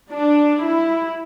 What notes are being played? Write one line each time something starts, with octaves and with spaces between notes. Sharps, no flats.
D4
E4